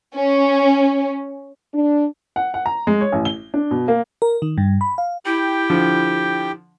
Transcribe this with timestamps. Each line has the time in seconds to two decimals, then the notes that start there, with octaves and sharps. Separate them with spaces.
0.14 C#4
1.74 D4
2.36 F#5
2.54 F#5
2.66 A#5
2.87 G#3
3.01 C#5
3.13 A1
3.25 G7
3.54 D4
3.71 B2
3.88 A#3
4.22 A#4
4.42 D#3
4.58 G2
4.81 B5
4.98 F5
5.26 E4 G4 G5
5.70 D3 F3